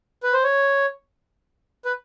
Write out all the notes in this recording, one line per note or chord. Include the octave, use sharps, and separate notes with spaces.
B4
C5
C#5
B4